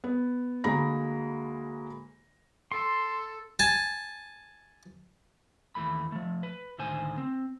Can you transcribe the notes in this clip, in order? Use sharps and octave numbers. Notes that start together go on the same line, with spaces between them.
B3
D2 G#3 A#3 A#5 B5 A#6
A4 C6
G#5 A5
D#2 E3 A3 B5
F3 A3
B4
C#2 A2 D3 D#3 C5 G#5
C4